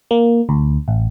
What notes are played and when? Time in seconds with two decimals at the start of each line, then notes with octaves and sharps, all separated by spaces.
0.11 A#3
0.49 D2
0.88 A1